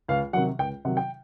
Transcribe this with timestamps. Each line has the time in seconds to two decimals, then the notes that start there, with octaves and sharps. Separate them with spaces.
0.08 C#2 F5
0.33 C3 D#3 F#3 F#5
0.58 C#2 G5
0.85 C3 D#3 F#3 F#5
0.97 G5